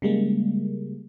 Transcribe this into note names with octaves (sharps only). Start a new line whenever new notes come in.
C#3 G3 G#3 A#3